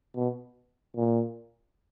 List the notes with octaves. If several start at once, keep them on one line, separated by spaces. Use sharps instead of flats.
B2
A#2